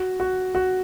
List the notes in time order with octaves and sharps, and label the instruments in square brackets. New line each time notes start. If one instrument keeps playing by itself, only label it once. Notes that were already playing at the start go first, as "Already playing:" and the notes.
Already playing: [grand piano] F#4
F#4
F#4